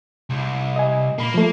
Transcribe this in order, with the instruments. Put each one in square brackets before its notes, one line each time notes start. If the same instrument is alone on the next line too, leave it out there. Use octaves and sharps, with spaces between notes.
[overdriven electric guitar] C2
[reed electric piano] D#5 G#5
[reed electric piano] A#2 B5 [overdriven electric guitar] A#3
[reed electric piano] F3 A3